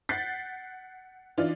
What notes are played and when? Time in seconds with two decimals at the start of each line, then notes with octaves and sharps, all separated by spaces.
0.09 F#5 F#6 G6 A6 B6 C7
1.38 E3 D4 D#4 F4 D5